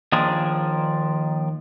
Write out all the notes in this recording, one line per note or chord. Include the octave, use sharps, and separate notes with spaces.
D#2 D#3 F3 D4 G#4